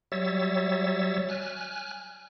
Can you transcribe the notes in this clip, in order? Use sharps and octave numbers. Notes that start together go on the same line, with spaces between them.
F#3 G3 C#5 E5 E6 A6
G#5 F6 F#6